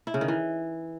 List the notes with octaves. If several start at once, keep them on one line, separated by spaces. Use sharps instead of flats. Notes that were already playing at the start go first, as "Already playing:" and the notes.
E4
C#3
D#3
E3